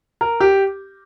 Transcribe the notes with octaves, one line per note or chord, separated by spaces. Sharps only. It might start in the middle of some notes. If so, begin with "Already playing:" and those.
A#4
G4